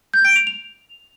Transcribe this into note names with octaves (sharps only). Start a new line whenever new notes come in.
G6
D7
F7
F7